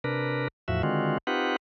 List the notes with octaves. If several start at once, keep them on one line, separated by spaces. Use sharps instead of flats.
C3 D4 A#4 B4
E2 A2 F3 F#4 E5
D3 D#3 G#3 C4 F4 F#4
C4 D#4 F4 G4 B4 F#5